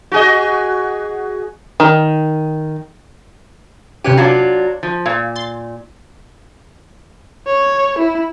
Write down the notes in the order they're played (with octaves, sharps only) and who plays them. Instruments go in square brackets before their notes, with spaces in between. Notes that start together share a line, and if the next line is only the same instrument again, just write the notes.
[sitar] F#4 G#4 D#5
[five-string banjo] D#3
[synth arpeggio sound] C3 B4 D#7 [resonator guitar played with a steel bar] C#4 G4
[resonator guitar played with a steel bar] F#3 D4 F4 [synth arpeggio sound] D5 F5 A5
[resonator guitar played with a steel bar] F3
[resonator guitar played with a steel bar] A#2 [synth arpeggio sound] F5
[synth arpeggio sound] C6 A6
[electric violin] C#5
E4